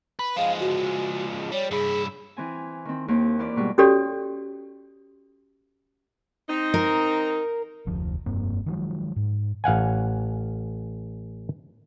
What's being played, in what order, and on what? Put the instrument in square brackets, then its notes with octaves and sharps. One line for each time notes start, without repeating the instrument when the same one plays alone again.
[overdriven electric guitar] B4
[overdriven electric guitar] F3 G#3 [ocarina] F5
[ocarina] F#4
[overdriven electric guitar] G3 [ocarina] C#5
[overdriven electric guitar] G2 E4 [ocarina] G#4
[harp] E3 C4 G#5
D#3 C4
D#2 A#3 C4
E3 F4 D5
G#2 B2 G3
[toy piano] C#4 F#4 G4 A4 C#5 D5
[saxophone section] C4 D#4
[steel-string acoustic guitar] A#4
[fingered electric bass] F1 D2 F3
F1 G2 A#3 C4
D#3 F3 F#3 G#3
G#2
[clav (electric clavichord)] A1 F5 F#5 G#5